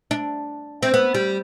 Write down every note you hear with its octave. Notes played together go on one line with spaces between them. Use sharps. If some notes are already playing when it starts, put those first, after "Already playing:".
D4
C4
B3
G3